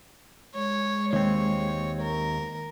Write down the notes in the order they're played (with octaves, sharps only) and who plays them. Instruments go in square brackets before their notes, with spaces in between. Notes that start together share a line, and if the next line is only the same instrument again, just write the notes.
[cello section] G#3 [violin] C#5
[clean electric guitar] D#2 C4 [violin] C#5
[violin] A#4